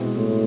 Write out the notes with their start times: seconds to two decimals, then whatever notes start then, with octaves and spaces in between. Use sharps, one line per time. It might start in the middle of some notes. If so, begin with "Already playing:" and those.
Already playing: B2 G#3 C4 E4
0.16 A2